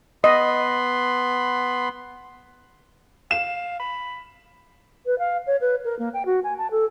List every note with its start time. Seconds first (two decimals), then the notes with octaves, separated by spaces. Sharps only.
0.24 B3 D#5 B5 C6
3.31 F5 E7
3.79 B5
5.06 B4
5.19 F5
5.47 C#5
5.61 B4
5.85 A#4
5.99 A#3
6.14 G5
6.26 F#4
6.44 G#5
6.58 A5
6.71 A4